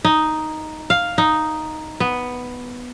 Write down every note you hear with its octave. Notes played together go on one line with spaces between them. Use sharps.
D#4
F5
D#4
B3